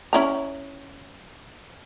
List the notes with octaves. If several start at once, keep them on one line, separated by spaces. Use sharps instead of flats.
C#4 E4 A#5